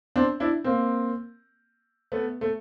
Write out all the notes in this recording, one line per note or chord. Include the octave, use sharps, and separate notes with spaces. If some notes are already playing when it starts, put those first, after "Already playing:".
C4 D4
D4 E4
A#3 C4
A3 B3
A3